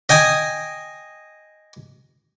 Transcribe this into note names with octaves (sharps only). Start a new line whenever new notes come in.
D#5 G5 G#5 D#6